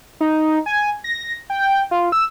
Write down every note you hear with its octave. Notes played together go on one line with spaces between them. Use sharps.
D#4
G#5
A#6
G5
F4
E6